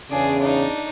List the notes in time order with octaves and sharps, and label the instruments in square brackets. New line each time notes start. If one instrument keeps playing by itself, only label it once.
[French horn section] E2 C#3 [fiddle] D4 G#4
[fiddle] D4 D#4